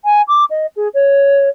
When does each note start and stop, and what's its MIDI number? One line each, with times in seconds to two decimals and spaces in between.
0.04 0.21 80
0.28 0.44 86
0.50 0.66 75
0.76 0.88 68
0.94 1.49 73